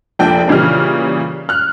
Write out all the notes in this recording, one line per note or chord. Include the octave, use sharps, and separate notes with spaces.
F1 A#1 A#2 D4 G5
A#2 C#3 E3 G3 F6
F6 F#6